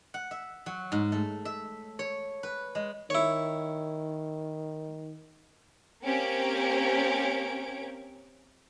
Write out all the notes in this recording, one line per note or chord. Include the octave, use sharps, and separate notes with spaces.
F#5
E5
F#3
G#2
A3
E5
C#5
B4
G#3
D#3 E4 C#5
A#3 C4 C#4 G4 C#5 D7